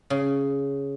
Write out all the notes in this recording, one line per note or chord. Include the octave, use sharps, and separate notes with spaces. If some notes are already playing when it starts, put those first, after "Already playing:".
C#3